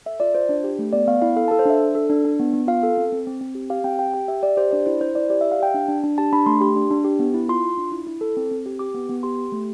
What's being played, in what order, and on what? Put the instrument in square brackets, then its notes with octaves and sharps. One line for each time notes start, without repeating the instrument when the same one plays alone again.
[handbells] A4 E5
F4 D5
F4 C5
D4
G4
A3
B3 D5
B3 F5
E4 F5
A4 F5
A5
A4
C5
D4 E5
D4
A4
D4
D4
B3
B3
F4 F5
A4
C4
C4
C4
C4
G4
G4 F5
C4 G5
G4 G5
G4 G5
G4 E5
G4 D5
G4 C5
D4 D5
E4 C5
E4 C5
E4 D5
G4 D5
E5
G4
F5
G4 G5
D4
D4
D4
G4 A5
D4 B5
A3 C6
G4 C6
D4
D4
G4
B3
E4
F4 C6
F4
D4
E4
E4
A4
C4
C4
G4
G4 D6
B3
B3
G4 C6
G4
A3